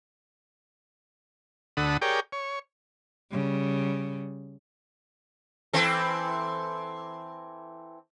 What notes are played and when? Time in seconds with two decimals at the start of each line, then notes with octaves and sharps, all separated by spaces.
1.77 D2 D3 A4 F#5 B5 D#6
2.02 G4 G#4 A#4 C#5 D5 G5
2.32 C#5
3.31 C#3 G3
5.73 E3 C4 A4